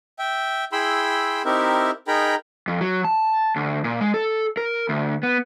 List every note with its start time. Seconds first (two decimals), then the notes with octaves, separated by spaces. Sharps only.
0.19 E5 G5
0.72 E4 G#4 G5 B5 C6 E6
1.45 C4 D#4 E4 G4 A#4 E5
2.08 D#4 G#4 A#4 G5 A#5 B5
2.68 F2
2.81 F#3
3.04 A5
3.56 D2
3.84 A#2
4.01 G#3
4.14 A4
4.57 A#4
4.89 D2
5.23 B3